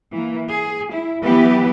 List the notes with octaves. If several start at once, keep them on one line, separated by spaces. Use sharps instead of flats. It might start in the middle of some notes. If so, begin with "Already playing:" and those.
E3 A#3
G#4
E4
E3 F#3 B3 E4 G4 B4